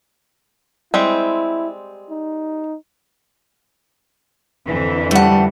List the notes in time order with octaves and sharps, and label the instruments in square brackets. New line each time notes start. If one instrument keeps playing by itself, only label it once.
[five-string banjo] G3 G#3 C4 [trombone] E4
[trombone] D#4
[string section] F2 D3 E3
[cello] G3 [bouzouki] A3 F#5